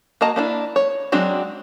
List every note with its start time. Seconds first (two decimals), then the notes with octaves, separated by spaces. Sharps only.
0.21 A#3 F#4 D#5 A5 A#5
0.36 A#3 D4 E4
0.76 C#5
1.12 F#3 G#3 C4 D4 F#4